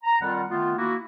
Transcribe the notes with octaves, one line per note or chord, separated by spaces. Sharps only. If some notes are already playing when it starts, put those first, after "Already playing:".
A#5
F2 D#3 G3 F4 F#5
D#3 A3 B3 F4
A#3 E4 F#4